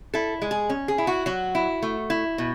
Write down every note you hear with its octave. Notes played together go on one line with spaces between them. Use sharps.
E4 A4
G#3
G#4
C#4
G#4
E4
F#4
F#3 F#4
E4
A3
E4
B2